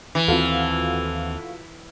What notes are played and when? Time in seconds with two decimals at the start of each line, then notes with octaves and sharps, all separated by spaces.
0.15 E3
0.28 D#2 C4 F4 F#4 A4